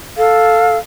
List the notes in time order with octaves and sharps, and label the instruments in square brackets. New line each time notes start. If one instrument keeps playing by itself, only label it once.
[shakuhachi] A4 [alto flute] F5